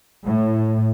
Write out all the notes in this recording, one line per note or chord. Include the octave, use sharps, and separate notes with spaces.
A2